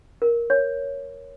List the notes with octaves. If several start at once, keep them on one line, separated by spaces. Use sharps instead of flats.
A#4
C#5